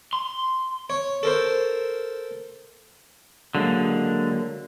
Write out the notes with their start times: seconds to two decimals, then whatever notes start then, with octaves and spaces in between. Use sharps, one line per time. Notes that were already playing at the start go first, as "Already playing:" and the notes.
0.13 C6
0.90 C#5
1.23 A4 A#4 C5
3.55 D3 F#3 G#3 A#3